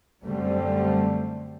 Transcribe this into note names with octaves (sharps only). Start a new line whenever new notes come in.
F#2 D3 G3 A3 C4